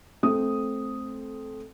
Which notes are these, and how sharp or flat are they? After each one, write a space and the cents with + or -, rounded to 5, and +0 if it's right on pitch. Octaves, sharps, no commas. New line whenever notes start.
A3 -20 C4 +0 D#6 +0